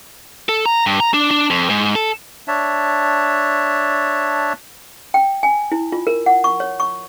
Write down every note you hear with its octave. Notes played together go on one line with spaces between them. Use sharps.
A4
A#5
G2
A#5
D4
D4
F2
G#2
A4
D4 C#5 E5 A5
G5
G#5
E4
F4
A#4
F#5
C#6
C#5
C#6